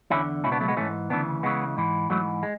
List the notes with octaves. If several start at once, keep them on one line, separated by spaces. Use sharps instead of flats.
E2 D3 C#4 E4
C#2 B2 C#4 E4
B3 D4
F#3 A3
G#3 B3
G#2 E3 A3 C#4
D2 C#3 E3 B3 D4
C#2 C#3 E3 G#3 B3
G#2 E3
G#2 E3 F#3 A3
G#3